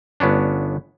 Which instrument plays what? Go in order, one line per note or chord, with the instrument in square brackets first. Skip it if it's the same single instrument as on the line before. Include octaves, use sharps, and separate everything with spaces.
[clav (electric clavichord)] G1 B3 C#4 D4